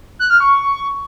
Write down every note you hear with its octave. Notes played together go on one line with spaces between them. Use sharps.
F#6
F6
C#6